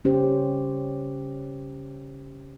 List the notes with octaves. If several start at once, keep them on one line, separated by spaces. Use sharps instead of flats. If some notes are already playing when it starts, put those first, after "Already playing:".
C#3 C#4 G4 C5